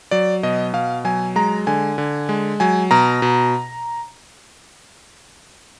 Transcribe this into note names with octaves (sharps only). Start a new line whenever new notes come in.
F#3 D5
B2 D#5
B2 F5
F#3 G#5
G#3 A#5
D3 G#5
D3
G#3
F#3 G#5
B2 A#5
B2